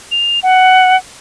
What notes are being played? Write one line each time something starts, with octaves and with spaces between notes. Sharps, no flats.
F7
F#5